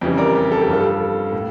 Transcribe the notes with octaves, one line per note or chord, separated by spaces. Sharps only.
F2 C#3 E3 G3
A#4 D5
G4
A4
G4
G2 F3
F4 A4
A2